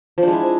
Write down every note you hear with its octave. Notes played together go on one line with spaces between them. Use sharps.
F3
D4
G#3
E4